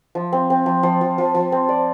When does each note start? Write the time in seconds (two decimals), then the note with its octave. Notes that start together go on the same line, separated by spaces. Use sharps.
0.15 F3
0.33 C4
0.50 C4
0.66 F3
0.83 F3
1.01 F3
1.18 F3
1.35 F3
1.52 C4
1.69 D5